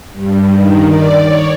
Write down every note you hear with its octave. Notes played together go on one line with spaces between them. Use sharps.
G2
D#3
D5
C#5